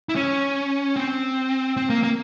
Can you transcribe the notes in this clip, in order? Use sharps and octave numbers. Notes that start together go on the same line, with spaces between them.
E4
C#4
C4
C4
A#3
A#3